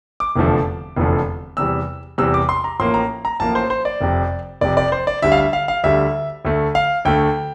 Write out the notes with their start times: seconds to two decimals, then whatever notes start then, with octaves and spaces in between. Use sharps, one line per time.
0.20 D6
0.36 F1 E2 D3 F3 A3
0.97 F1 E2 D3 F3 A3
1.57 E2 C3 G3 E6
2.18 E2 C3 G3 E6
2.34 D6
2.49 C6
2.64 A#5
2.79 A1 A2 F3 A#3 C6
2.94 A#5
3.25 A#5
3.40 A1 A2 F3 A#3 A5
3.55 C5
3.70 C5
3.85 D5
4.01 F1 F2 C3
4.61 F1 F2 C3 D5
4.77 D5
4.92 C5
5.07 D5
5.22 D2 D3 G3 E5
5.32 F5
5.37 E5
5.53 F5
5.68 F5
5.84 D2 D3 G3 E5
6.45 D2 D3 A3
6.75 F5
7.05 D2 D3 A3 G5